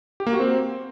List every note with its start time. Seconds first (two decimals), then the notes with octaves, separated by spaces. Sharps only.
0.20 G4
0.27 A#3
0.33 F#4
0.40 C4